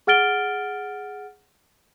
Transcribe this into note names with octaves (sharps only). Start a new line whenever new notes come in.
G#4 F#5 F6 A6 D7 G7